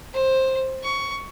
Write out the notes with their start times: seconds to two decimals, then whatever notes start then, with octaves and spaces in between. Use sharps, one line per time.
0.14 C5
0.83 C#6